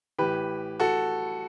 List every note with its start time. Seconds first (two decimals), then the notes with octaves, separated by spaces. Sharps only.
0.18 A2 E3 G4 B4
0.80 F#4 A4